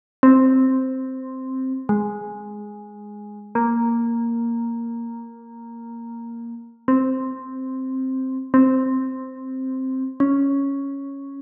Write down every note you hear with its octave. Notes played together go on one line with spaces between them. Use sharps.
C4
G#3
A#3
C4
C4
C#4